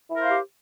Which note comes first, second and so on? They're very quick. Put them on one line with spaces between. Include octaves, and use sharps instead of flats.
E4 A#4 C5 F5 G4